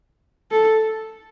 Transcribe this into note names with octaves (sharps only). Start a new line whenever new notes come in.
A4